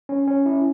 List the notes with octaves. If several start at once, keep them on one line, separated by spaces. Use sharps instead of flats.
C#4
C#4
E4